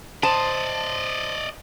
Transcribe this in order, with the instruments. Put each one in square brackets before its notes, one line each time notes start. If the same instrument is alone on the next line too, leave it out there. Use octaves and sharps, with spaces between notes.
[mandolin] C5 [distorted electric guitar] D5 D#5 [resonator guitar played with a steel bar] A5